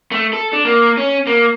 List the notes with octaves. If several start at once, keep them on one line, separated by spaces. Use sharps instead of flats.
A3
A4
D4
A#3
C#4
A#3